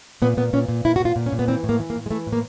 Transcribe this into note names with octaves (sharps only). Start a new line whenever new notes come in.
A#2 B3
A#2 B3
A#2 C#4
A#2
A#2 E4
F#4
A#2
F4
A#2
C#4
A#2
B3
E3 C4
A2
A#3
E3
A#3
A2
G#3
E3 A3
A2
A#3